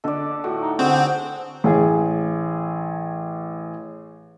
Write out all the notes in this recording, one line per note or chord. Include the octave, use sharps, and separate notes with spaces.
D3 D4 A4 D5 D#5
A2 F4 F#4
D#4
D3 C4 D4 F#4 G#4
A1 G#4